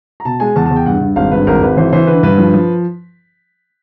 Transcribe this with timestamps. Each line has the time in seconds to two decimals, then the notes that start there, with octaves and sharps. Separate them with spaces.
0.20 A#5
0.25 B2 A5
0.40 G#3 G#5
0.56 E2 A5
0.66 E2 A5
0.76 G5
0.86 G2 F#5
1.01 G2
1.16 G#1 F5
1.31 G2 B4
1.47 G#1 A#4
1.62 G#1 B4
1.77 E3 C5
1.93 E3 C5
2.07 D3 B4
2.23 G2 B4
2.38 F3
2.54 F3